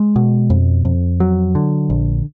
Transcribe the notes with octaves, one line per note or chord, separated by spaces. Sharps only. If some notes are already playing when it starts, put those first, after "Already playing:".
Already playing: G#3
B2
F2
F2
F#3
D3
A#1